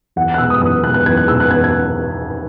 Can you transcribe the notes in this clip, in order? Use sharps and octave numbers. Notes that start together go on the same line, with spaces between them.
E2 F#5
F#6
B2 G#3 E6
D#6
E2 D#6
B2 G#3 F#6
F#6
E2 G#6
F#6
B2 G#3 E6
F#6
E2 G#6
G#6